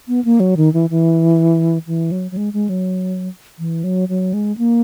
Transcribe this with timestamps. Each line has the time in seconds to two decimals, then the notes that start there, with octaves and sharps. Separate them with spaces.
0.08 B3
0.25 A#3
0.40 F#3
0.57 D#3
0.73 E3
0.90 E3
1.87 E3
2.12 F#3
2.31 F#3
2.37 G#3
2.53 G#3
2.69 F#3
3.59 E3
3.84 F#3
4.09 F#3
4.34 G#3
4.58 A#3